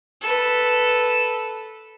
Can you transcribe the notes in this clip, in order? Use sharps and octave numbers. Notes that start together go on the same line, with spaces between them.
A4 B4